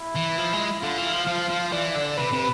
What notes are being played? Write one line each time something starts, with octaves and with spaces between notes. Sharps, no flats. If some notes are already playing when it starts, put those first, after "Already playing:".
Already playing: E4
E3
F3
G#3
D3 F4
E3
F3
F3
F3
E3 D5
D3
C3 B4
C3